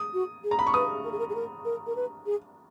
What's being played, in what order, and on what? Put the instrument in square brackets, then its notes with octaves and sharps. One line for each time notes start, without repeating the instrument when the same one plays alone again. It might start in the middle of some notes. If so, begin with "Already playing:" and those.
Already playing: [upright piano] D#6
[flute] F#4
G#4
[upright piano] A#5
B5
C#6
[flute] B4 [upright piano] D#6
[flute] A#4
G#4
A#4
G#4
A#4
A#4
A#4
B4
G#4